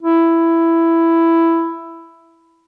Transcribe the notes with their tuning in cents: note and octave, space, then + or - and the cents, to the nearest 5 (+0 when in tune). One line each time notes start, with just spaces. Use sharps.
E4 +10